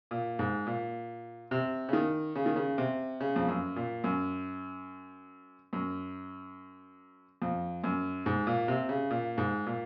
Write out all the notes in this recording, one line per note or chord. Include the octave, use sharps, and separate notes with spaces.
A#2
G#2
A#2
C3
C#3
D#3
C#3
D#3
C#3
C3
C#3
F2
F#2
A#2
F#2
F#2
F2
F#2
G#2
A#2
C3
C#3
A#2
G#2
A#2